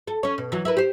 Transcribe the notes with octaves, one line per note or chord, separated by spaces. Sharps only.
A4
C#4 C#5
B2
E3 F#3
E4 A#4 B4
G4 C5